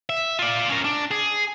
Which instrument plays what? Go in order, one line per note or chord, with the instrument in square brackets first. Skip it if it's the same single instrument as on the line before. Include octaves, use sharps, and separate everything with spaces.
[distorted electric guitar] E5
F4 D5
C#4 A#4
D4
G#4